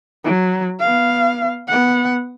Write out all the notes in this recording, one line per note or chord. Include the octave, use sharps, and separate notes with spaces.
F#3
B3 F5
B3 F#5